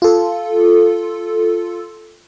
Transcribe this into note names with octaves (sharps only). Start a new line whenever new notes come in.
F4 A4